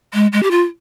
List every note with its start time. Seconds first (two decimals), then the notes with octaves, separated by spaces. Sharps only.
0.14 G#3
0.33 G#3
0.43 G4
0.51 F4